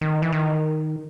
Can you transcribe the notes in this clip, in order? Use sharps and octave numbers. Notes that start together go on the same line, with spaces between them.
D#3
E3
D#3